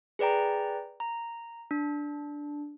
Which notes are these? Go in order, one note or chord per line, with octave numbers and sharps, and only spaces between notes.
G#4 B4 D5 G5 A#5
A#5
D4